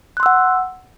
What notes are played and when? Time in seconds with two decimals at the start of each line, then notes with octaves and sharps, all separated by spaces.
0.17 F#6
0.20 C6
0.23 E6
0.26 F#5